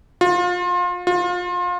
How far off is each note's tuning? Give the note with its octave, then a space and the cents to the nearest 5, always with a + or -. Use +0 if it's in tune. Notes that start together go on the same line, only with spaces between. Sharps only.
F4 +30
F4 +30